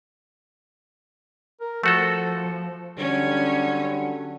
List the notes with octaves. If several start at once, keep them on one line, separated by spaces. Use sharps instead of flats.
A#4
F3 A3 F#4 A4
D3 F#3 G3 C#4